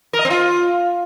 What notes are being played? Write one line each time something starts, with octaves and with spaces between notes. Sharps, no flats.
A#4
D#5
C4
F4